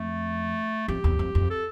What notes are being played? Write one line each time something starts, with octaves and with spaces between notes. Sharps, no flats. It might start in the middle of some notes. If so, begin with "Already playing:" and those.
Already playing: F2 A3
F2 G4
E2
F2
F2
A4